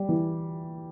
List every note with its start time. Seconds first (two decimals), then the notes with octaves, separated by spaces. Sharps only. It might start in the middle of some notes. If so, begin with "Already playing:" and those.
Already playing: G3
0.09 E3